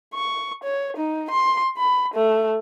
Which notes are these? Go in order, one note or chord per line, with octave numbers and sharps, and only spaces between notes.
C#6
C#5
D#4
C6
B5
A3